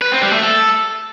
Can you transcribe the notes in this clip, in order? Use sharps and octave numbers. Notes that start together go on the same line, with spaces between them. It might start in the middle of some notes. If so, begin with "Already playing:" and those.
B4
C4
G3
A3
A4